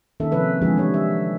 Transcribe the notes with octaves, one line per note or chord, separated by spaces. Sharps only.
D#3 A#3 C#4 A4 E5
C3 F3 A3 B4 E5
D3 E3 F3 G#3 F#4 G#4
E3 G3 C#5
E5